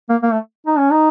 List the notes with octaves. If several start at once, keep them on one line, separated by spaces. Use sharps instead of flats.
A#3
A#3
A3
D#4
C#4
D#4